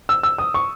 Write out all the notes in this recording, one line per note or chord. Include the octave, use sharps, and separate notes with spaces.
E6
E6
D#6
C#6